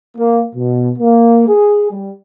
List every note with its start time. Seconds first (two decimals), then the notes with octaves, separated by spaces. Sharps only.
0.17 A#3
0.54 B2
0.98 A#3
1.48 G#4
1.91 G3